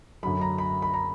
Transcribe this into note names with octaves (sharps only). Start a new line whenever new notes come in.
F#2 D3 F#3 B5
A#5
B5
B5
A#5